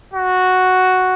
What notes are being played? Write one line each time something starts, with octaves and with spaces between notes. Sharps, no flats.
F#4